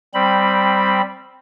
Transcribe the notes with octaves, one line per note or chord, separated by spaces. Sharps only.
G3 C4 B5